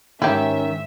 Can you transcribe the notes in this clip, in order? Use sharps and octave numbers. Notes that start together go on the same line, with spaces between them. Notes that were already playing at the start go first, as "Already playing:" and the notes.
G#2 D#3 C#4 E4 G4 E5